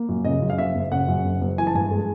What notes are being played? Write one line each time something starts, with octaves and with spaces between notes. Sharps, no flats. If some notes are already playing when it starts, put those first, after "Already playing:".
Already playing: A#3
F#2
C#3 D#5
F#2
F5
F#1 E5
F#1
C#3 F#5
F#2
F#1
F#1
E3 G#5
A5
G2 G#5
G#3